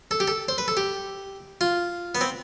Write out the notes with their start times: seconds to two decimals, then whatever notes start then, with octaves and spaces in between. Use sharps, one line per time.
0.11 A4
0.20 G4
0.28 A4
0.48 C5
0.58 B4
0.68 A4
0.77 G4
1.61 F4
2.15 B3
2.21 C4